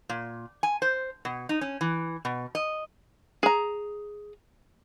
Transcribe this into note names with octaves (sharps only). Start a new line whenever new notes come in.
A#2
G#5
C5
B2
D#4
C#4
E3
B2
D#5
G#4 A#5